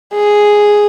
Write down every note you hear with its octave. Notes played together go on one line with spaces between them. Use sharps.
G#4